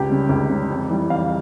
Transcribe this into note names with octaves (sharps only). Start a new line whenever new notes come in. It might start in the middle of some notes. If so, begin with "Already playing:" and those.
Already playing: C#2 G4
C#3 G3
C#2
C#3 G3
F2
E3 G3
F2 F5